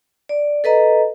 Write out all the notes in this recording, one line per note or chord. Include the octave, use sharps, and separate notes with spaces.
D5
A4 B4 D#5 A#5